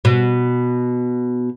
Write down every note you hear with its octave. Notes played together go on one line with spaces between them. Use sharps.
B2